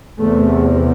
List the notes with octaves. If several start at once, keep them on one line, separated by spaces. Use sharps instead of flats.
E2 C3 A3